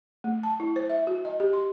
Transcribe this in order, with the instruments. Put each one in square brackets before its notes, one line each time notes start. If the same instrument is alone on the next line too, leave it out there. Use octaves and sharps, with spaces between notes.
[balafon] A3
A5
E4
C5
E5
F#4
D#5
G4
C6